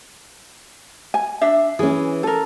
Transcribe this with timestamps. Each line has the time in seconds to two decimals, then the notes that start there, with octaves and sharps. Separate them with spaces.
1.14 G#5
1.41 D4 E5
1.79 E3 C#4 G#4
2.23 A4 A#4